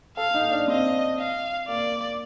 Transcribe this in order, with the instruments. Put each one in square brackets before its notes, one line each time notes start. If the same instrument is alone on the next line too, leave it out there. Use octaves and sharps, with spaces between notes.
[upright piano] A4 [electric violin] F5
[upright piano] D#4
D4
[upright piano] C4 [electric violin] D#5
[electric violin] F5
[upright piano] A#3 [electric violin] D5